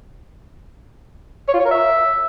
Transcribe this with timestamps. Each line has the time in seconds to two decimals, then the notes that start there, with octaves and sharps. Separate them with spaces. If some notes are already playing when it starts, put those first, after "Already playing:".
1.48 C#5
1.54 F4
1.60 C#5
1.65 A#4
1.71 E5